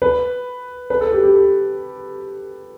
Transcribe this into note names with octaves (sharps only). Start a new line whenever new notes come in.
B4
B4
A4
G4
G4
A4